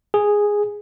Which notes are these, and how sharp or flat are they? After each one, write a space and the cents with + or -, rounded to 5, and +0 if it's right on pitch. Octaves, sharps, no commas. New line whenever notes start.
G#4 -5